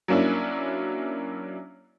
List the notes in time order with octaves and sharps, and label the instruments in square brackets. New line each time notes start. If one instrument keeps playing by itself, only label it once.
[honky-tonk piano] F#3 A#3 C#4 D4 E4